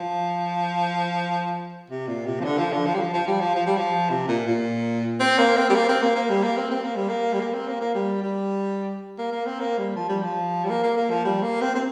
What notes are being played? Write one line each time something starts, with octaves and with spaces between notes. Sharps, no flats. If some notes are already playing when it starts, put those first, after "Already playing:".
Already playing: F3
C3
A#2
C3
F3
D3
F3
D3
F3
G3
F3
F3
G3
F3
F3
G3
F3
C3
A#2
A#2
C4
A#3
C4
G3
A#3
C4
A#3
A#3
G3
A#3
C4
C4
A#3
G3
A#3
G3
A#3
C4
A#3
A#3
G3
G3
A#3
A#3
C4
A#3
G3
F3
G3
F3
G3
A#3
A#3
A#3
F3
G3
A#3
C4
C4